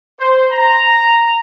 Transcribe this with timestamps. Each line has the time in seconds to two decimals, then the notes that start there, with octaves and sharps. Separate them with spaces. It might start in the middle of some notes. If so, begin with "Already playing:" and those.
0.19 C5
0.51 A#5